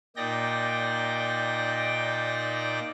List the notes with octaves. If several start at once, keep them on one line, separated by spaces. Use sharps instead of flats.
A#2 D#4 D5 G5 A#6